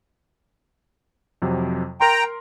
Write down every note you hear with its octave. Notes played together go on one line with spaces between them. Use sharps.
F2 C3 F#3
A#4 G5 A#5 C6